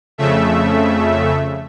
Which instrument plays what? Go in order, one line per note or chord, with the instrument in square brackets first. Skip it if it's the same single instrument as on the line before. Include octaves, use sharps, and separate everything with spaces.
[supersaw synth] F2 C#3 A3 E5